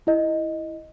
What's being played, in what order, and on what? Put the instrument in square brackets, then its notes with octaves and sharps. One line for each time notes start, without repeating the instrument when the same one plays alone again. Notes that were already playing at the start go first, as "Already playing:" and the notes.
[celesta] E4 D#5